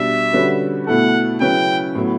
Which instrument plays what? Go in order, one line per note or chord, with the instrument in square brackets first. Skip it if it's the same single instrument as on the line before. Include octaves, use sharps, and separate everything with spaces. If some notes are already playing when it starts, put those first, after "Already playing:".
Already playing: [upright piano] B2 G3 D4 [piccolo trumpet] E5
[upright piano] D3 G3 C#4 F#4 B4
[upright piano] B2 A3 E4 A4 [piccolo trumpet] F#5
[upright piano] C#3 F#3 C#4 E4 B4 [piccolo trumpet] G5
[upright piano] A2 F#3 B3 E4